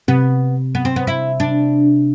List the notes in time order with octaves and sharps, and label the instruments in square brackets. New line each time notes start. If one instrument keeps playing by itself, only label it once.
[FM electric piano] C3 [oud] B3
[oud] B3
C4
B3
E4
D4